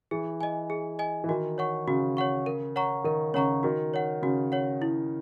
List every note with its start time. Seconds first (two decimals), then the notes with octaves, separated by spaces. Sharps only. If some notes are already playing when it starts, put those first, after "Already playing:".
0.11 E3 G#4
0.41 D#5 G#5
0.70 G#4
0.99 D#5 G#5
1.24 E3
1.29 D#3 F#4
1.58 C#5 F#5 C#6
1.87 C#3 F#4
2.17 C#5 F#5 C#6
2.46 A#4
2.76 C#5 F#5 A#5 C#6
3.04 D#3 A#4
3.34 C#3 C#5 F#5 A#5 C#6
3.63 D#3 F#4
3.94 C#5 F#5
4.22 C#3 F#4
4.52 C#5 F#5
4.82 E4